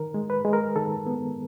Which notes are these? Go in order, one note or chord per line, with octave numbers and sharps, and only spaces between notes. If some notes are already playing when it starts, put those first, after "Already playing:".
Already playing: D#3 A#4
G#3
B4
G#3
A#4
D#3 A4
B3